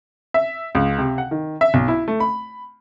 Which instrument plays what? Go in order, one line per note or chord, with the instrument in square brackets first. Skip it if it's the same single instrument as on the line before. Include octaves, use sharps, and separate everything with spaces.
[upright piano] E5
C#2
C3
F#5
D#3
E5
B1
E4
A3
B5